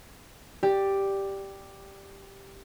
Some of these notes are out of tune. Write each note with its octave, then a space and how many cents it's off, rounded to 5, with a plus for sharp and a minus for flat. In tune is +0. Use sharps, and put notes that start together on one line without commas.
G4 +0 D5 +5